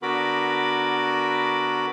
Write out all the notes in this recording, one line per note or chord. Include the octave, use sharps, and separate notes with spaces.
D3 B3 F#4 A#4 B5 D6